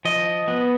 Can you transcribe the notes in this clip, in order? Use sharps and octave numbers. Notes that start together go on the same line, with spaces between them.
F3 D#5
B3